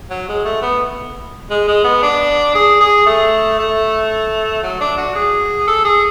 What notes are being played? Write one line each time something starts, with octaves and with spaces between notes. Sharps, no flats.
F#3
G#3
A3
B3
G#3
G#3
B3
D4
G#4
G#4
A3
A3
F#3
D4
F#4
G#4
A4
G#4